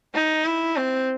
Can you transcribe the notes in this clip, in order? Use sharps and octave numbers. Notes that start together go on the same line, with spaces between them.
D#4
E4
C4